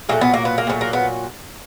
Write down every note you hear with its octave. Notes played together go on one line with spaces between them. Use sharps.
A#2 F#3 A3 A#3
B3
A#3
B3
A#3
A#2 F#3 A3 B3
A#3
B3